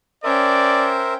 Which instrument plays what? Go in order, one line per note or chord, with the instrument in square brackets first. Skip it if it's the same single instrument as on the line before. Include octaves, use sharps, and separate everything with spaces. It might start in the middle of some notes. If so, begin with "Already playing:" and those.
[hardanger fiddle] C#4 G5 [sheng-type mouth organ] A#4 C5 E5 [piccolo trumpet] D5